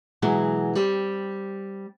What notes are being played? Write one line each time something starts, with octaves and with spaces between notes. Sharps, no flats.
B2 E3 F#3 G#3 E4 G#4
G3 C4